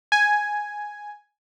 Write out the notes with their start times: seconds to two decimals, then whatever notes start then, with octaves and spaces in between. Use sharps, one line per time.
0.12 G#5